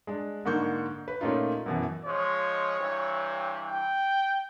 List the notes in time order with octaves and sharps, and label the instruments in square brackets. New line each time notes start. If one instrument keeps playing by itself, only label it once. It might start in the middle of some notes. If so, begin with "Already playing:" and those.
[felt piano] G#3 D4
G#2 D3 A#3 C#6 G6
B4
A#2 A3 C#4 D#4 F4
F#2 B2 E3
[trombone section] F3 G#3 [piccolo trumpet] C#5
[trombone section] G2 C3 E3
[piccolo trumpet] G5